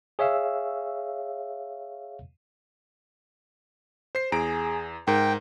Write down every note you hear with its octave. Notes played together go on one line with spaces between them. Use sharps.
G#4 C#5 E5 F5 E6
C5 C7
E2 G#4 A#5 D7
G#2 A#4 G5